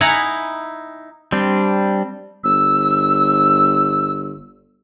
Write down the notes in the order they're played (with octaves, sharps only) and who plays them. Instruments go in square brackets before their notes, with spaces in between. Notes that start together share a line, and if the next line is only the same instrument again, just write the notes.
[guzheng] D#4 E4 F#5 G#5 A#5 B5
[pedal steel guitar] G3 C4 D4
[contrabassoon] G1 [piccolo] E6